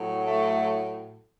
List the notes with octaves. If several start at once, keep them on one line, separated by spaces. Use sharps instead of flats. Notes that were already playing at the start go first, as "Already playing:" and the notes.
Already playing: A2 F#3
A3